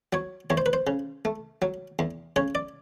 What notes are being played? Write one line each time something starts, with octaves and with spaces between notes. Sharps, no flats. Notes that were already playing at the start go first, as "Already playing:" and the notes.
F#3 C#5
E2 C#5
C5
B4
C5
C#3
A3
F#3
E2
C#3 C#5
D5